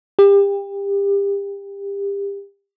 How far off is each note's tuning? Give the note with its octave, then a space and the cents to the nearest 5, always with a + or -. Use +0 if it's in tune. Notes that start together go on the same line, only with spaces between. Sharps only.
G4 +30